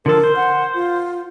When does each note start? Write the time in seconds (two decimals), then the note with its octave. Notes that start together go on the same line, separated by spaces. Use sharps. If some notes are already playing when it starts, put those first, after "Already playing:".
0.06 D3 F3 A4 A#4
0.23 C5
0.36 F#5
0.75 F4